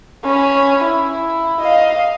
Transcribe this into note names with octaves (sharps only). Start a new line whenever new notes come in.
C#4 B5
E4
D#5 F5